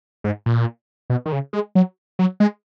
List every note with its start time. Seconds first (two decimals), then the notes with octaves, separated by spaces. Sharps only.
0.24 G#2
0.46 A#2
1.10 B2
1.26 D#3
1.32 C#3
1.53 G#3
1.75 F#3
2.19 F#3
2.40 G#3